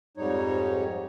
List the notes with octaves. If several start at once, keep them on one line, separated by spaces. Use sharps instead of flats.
F2 G#2 G3 D#4 C#5